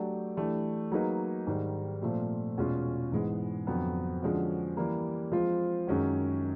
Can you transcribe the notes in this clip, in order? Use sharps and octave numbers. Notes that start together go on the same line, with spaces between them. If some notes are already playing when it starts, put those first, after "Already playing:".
Already playing: F#3 A3 D4 G4
E3 A3 D4 G4
F#3 A#3 D#4 G#4 B4
G#2 D#3 G3
A#2 F3 A3 C4 F4
E2 B2 G#3 C#4 F4
G#2 E3 G#3 B3
F2 D3 F#3 B3
D3 F3 G#3 C#4 F#4
E3 G3 A#3
F3 G#3 C4 F4
F#2 D#3 G#3 C#4 F#4